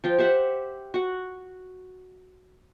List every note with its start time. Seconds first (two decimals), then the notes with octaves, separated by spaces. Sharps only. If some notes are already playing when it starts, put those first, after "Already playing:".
0.04 F3 F4 G5
0.18 G4 C5 E5 F#5
0.94 F#4 F#5